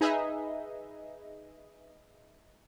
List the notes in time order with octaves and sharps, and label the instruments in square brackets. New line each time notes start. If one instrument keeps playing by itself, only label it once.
[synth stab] D#4 G#4 B4 D#5 E5